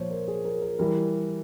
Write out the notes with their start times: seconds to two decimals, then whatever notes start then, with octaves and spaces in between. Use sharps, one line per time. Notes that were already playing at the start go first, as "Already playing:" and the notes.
Already playing: A#2 F3 C5 C#5
0.10 A#4
0.28 G#4
0.45 A#4
0.62 A#4
0.79 E3 G3 A#4